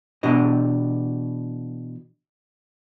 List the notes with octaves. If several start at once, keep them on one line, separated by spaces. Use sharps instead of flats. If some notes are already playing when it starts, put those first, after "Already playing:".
B2 E3 D4 G4 D#5